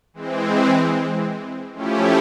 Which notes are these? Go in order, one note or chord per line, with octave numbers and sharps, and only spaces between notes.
E3 G#3 C4
F3 A3 C#4 E4 G4